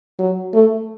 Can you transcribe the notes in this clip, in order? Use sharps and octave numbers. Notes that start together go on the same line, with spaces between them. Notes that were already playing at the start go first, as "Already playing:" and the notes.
F#3
A3